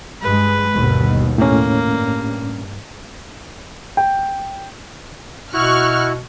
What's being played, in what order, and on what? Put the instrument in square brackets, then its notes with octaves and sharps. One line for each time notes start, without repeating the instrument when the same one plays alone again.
[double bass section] G2 G#3 [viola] B4
[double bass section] G1 D#2 B2
[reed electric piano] A2 C#4 [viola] A#3
[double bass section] G2
[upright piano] G5
[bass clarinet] B2 [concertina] E4 F#4 [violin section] C#6 F6 F#6